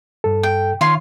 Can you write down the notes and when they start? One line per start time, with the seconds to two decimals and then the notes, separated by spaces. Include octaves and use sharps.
0.24 G2 A4
0.43 G5
0.81 D#3 F4 C#5 C6